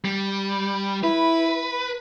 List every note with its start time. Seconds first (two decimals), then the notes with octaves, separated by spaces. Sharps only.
0.05 G3
1.04 E4 B4